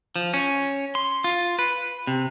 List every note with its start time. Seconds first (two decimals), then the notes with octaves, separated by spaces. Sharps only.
0.16 F3
0.34 C#4
0.95 C6
1.24 F4
1.59 B4
2.07 C3